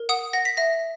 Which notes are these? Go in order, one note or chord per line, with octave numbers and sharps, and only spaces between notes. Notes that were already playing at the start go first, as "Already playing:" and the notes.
Already playing: A#4
F#5 D#6
F#5 A#6
B6
E5 A#6